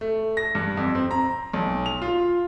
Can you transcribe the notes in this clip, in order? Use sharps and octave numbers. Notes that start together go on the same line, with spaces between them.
A3
A#6
G2
F2
C4
A#5
B1
F7
F4